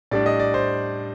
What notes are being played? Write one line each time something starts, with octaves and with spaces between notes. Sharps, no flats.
A2 G3 D4 D5
D#5
D5
C5